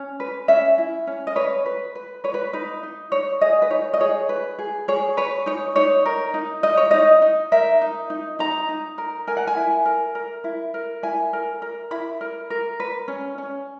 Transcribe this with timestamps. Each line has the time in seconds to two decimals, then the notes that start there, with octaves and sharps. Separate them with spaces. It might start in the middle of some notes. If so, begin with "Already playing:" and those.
Already playing: C#4
0.20 B4
0.48 C#4 E5
0.78 E4
1.07 C#4
1.27 D#5
1.36 B4 C#5
1.66 B4
1.95 B4
2.24 B4 C#5
2.34 B4
2.53 D#4 B4
2.83 D#4
3.12 D#4 C#5
3.41 G#4 D#5
3.62 B4
3.70 D#4 C#5
3.94 D#5
4.00 G#4 C#5
4.29 B4
4.59 G#4
4.88 G#4 C#5
5.17 B4 C#5
5.46 D#4 C#5
5.76 D#4 C#5
6.06 A#4
6.34 D#4
6.63 D#4 D#5
6.77 C#5
6.91 D#4 D#5
7.22 D#4
7.52 A#4 E5
7.81 D#4
8.10 D#4
8.39 D#4 A#5
8.69 D#4
8.98 A#4
9.27 A#4 G#5
9.37 F#5
9.47 G#5
9.57 E4
9.85 A#4
10.15 A#4
10.44 E4
10.74 A#4
11.03 E4 G#5
11.33 A#4
11.62 A#4
11.91 E4 B5
12.21 A#4
12.50 A#4
12.80 B4
13.08 C#4
13.38 C#4